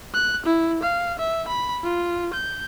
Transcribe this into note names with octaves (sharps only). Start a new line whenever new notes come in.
F#6
E4
F5
E5
B5
F4
G6